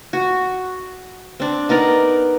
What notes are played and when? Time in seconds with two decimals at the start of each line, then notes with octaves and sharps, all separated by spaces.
0.13 F#4
1.40 C4 D4
1.69 B3 D#4 A#4 D5